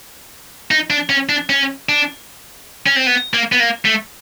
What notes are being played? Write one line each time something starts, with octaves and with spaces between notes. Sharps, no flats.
D#4
D4
C#4
D4
C#4
D4
C#4
C4
B3
A#3
B3
A#3
A3